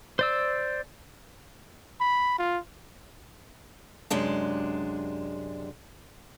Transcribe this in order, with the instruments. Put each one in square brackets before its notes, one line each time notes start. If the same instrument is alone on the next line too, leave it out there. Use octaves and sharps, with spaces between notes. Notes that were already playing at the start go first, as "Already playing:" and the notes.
[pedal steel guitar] C5 D5 E6
[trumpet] B5
F4
[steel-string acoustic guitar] F#2 C3 G#3 D4